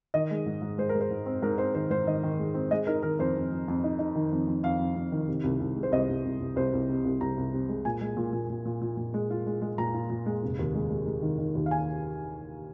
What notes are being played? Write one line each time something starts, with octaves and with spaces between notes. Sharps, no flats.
D#3 D#5
G#3
G#2
G#2
G#3 C5
G#3 A#4
C5
G#2
C4
G#2 A#4
C4 C5
D#3 C5
G#2 C5
D#3 D#5
D#3
G#3
C4
G#3 D#5
D#4 A#4
D#3 A#4
F2 C5
F2
F2
F2
D#4
D#4
D#3
F2
F2
F2 F5
F2
F2
D#3
C3
C2
C2
G#3
C5
C2 D#5
C2
C2
C2
C2 C5
C2
C3
C2
C2 A#5
C2
C3
G#3
A#2 G#5
G#3
A#2
A#2
A#2
A#2
A#2
A#2
G#3
F4
G#3
G#3
A#2 A#5
F4
A#2
G#3
F1
D#2
G#3
G#3
G#3
D#3
D#3
D#2
F5
G#5